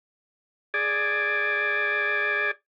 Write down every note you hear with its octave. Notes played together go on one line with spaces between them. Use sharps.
G#4 D5